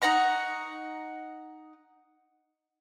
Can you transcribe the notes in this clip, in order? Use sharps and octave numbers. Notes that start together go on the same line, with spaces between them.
D#4 F#5 A#5 C#6